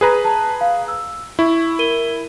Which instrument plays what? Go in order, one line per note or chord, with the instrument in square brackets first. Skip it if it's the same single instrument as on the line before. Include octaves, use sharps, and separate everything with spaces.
[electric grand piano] G#4 B4 A#5
[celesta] A5
F5
E6
[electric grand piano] E4 [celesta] C#6
[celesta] A#4 D#7 G7